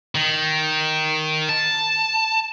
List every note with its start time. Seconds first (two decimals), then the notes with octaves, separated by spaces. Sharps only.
0.15 D#3
1.49 A5